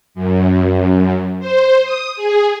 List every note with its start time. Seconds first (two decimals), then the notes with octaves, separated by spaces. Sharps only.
0.15 F#2
1.40 C5
1.84 D#6
2.16 G#4